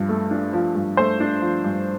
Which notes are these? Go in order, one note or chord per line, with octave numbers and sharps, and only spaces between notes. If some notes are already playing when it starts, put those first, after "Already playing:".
Already playing: G2 F3
A3
D4
F3
G2
A3 C5
D4
F3
G2